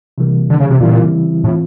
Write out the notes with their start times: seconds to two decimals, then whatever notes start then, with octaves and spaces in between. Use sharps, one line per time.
0.18 C3 E3 G3 A#3
0.50 D3
0.60 C#3
0.70 C3
0.80 A#2 C#3 E3 G3 C4 E4
1.43 A2 E3 A3 C4 F4